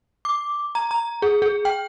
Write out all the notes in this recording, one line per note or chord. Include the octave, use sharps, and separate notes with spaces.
D6
A#5
A#5
G#4
G#4
G5